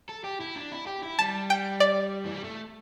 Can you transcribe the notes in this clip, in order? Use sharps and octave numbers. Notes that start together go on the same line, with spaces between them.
A4
G4
E4
D4
E4
G4
E4
G3 A5
G5
D5
E3
G3
A3